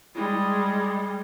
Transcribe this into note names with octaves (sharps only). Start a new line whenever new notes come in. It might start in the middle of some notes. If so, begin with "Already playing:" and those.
G3 G#3